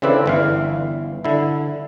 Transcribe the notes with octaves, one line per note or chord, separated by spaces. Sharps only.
C#3 E3 C4 D4 A4 B4
G1 E3 F5
D3 E4